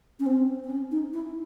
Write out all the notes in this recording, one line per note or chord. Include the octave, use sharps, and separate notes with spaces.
C#4
C4
C4
C#4
D#4
E4